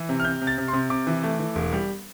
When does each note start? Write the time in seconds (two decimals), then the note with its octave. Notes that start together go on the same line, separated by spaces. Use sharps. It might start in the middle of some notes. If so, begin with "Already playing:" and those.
Already playing: E3
0.09 C3
0.20 F6
0.24 C3 G6
0.41 C3
0.47 A6
0.58 C3
0.68 C6
0.73 C3
0.90 C3 D6
1.07 E3
1.23 A3
1.39 E3
1.55 E1
1.73 G3